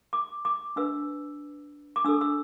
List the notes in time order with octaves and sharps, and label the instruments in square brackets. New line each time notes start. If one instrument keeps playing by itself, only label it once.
[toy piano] D6
D6
D4 B4 E6
D6
D4 E6
A4
E6